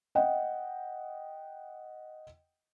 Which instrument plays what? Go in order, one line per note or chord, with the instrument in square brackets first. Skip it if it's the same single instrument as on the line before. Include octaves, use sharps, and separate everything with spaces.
[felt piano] D#5 F#5 G5